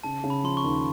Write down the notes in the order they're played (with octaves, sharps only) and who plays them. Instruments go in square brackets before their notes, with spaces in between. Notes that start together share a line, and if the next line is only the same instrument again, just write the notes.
[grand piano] C#3 [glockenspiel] A5
[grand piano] C#3
[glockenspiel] B5
[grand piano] F3 [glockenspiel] C6
[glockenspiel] C#6
[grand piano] D#2